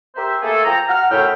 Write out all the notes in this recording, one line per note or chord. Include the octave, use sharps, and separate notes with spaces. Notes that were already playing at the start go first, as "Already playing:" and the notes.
G4 A#4 C5 E5
A3 A#3 G#4 A4
F3 G5 A#5
F#5 F6
F#2 A2 C#3 E5 G5